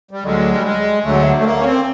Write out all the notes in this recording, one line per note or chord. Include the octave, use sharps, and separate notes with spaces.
G3
D2 D3 F#3 G#3
G3
G#3
D2 D3 F#3 A3
A3
A#3
C#4
C4